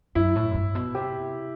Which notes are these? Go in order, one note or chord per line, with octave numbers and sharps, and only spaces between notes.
F#2 E4
A2
F#2
G2
B2
C3 G4